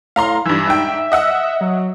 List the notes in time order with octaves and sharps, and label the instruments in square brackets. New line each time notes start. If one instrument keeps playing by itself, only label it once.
[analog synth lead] A2 [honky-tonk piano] F5 A#5 C6
[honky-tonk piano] G2 E3 [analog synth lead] E5
[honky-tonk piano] G#2 G5
D#5 F#5 E6
[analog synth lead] F#3